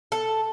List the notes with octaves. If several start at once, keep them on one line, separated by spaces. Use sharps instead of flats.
A4